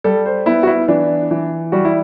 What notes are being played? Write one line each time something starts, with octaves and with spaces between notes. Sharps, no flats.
G3 A4
C5
B3 E4
F#4
E4
E3 D4
E3
G3 F#4
E4